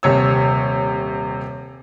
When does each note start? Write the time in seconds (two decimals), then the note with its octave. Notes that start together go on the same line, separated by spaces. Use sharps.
0.03 D#1 C3 C#5 E6